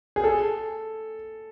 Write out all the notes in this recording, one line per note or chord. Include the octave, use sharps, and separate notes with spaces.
G#4
A4